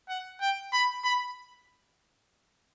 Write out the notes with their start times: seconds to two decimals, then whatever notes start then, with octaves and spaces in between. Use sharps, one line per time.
0.09 F#5
0.41 G5
0.73 B5
1.04 B5